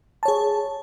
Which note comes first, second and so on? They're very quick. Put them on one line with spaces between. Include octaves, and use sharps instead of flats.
A5 C#5 G#4